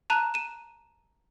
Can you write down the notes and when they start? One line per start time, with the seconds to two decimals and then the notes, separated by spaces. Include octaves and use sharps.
0.10 A5 A#5 F#6 D#7
0.34 D#7 E7